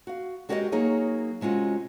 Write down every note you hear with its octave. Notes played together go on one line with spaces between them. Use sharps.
F#4 F5
G#3 F#4 G4 A#4 D5 D#5
F#3 A#3 D#4 G#4 C#5
C3 G#3 C#4 F4 F#4